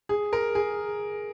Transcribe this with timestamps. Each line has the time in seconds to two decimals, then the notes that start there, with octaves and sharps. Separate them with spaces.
0.09 G#4
0.33 A#4
0.55 G#4